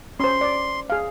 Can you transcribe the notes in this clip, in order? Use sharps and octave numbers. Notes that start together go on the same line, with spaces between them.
C#4 C5 C6
D5
G#4 F5